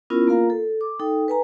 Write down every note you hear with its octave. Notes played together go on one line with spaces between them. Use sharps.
B3 C#4 E4 F4 A#4
A#3 F4 A#4 F5 A#5
A4
D6
D#4 A4 G5
B4 G#5 A#5